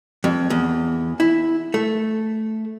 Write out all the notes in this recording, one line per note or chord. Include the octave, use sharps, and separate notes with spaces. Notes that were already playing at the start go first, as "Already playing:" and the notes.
F2
E2
E4
A3